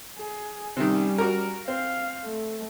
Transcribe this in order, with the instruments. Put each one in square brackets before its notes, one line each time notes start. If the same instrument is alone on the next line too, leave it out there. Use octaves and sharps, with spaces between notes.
[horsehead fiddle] G#4
[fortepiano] C3 D#3 [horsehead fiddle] G3 C#4
[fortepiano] F#4 A#4
[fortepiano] C4 [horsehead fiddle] F5
[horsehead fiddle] A3